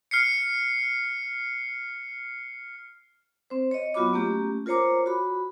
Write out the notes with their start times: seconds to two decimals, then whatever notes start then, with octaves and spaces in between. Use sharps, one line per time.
0.11 F6 C7 C#7
3.50 C4 C5
3.71 C#5 D#5
3.94 F#3 B3 F4 F#4 B5 D6
4.13 A3 A#3 C#4 G4
4.66 F4 A#4 C5 C#5 A#5 D6
5.06 F#4 B5